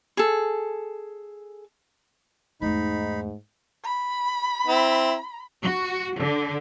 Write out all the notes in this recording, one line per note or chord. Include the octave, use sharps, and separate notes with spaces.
G#4 A4
E2 G#2 A3 D#4 B5
B5
C4 E4
F#4
D3